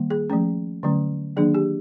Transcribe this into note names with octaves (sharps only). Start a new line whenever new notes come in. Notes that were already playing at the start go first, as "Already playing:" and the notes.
Already playing: D#3 G3 A#3
G#4
F3 A3 C#4
D3 F#3 A3 C#4
D#3 F#3 A#3 D4 G#4
G4